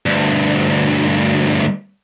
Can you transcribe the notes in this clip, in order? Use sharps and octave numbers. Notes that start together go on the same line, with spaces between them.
D2 G2